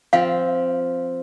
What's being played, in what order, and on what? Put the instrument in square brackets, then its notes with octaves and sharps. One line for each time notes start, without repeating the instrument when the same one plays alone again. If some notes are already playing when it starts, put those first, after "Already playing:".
[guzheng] F3 C4 [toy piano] F5